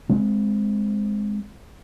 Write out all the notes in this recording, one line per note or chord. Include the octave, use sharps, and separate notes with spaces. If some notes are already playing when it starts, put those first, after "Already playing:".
G#3 C4